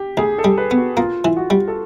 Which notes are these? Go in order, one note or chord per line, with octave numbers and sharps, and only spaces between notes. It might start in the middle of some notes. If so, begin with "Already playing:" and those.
Already playing: G4
D2 G#4
A4
G3
B4
B3
F#4
A#3 F4
E3
F#4
G3
A4